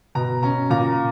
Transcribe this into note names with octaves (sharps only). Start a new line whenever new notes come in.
B2 A#5
C#4 A#5
A#2 A#5